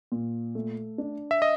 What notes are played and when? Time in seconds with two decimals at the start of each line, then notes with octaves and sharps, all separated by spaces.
0.12 A#2
0.55 A3
0.98 D4
1.31 E5
1.42 D#5